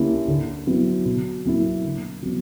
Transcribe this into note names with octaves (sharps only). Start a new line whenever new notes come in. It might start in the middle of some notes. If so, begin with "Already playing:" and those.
Already playing: D3 G3 A#3 C#4 E4
D3
F#3 B3 E4
B2
F#3 A#3 E4
D3
F#3 B3